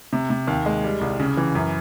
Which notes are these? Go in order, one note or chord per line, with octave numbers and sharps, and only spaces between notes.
C3
C3
D#2
G#3
G3
C2
C#3
E3
F#2